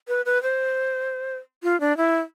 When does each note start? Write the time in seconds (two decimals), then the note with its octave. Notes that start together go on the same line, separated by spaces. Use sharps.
0.08 B4
0.26 B4
0.43 C5
1.63 F4
1.80 D4
1.97 E4